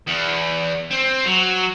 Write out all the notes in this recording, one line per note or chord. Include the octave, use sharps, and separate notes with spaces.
E2
C4
F#3